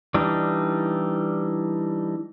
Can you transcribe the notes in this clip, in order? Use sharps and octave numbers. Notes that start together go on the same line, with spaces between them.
E3 G3 D4 D#4